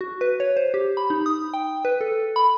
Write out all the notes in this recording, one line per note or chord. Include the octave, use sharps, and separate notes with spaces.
F#4
B4
C#5
C5
G4
B5
D#4
D#6
G5
B4
A4
B5